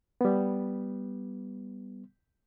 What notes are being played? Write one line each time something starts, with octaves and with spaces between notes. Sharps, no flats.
G3 B3